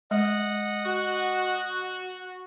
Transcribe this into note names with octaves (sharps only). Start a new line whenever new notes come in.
G#3 D#5 F#5
F#4